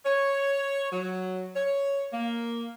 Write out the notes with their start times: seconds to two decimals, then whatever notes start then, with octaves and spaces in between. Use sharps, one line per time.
0.05 C#5
0.92 F#3
1.55 C#5
2.13 A#3